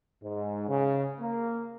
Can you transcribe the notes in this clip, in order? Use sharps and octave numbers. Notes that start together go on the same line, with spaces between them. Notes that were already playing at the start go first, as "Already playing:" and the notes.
G#2
C#3
A#3